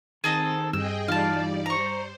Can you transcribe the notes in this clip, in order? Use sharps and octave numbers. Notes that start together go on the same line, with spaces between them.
D#3 C4 G#4 A4 D#5
G2 G#4 D#5 G5 E6
E3 G3 D#4 F4 D5 F5 A5
C5 A#5 C#6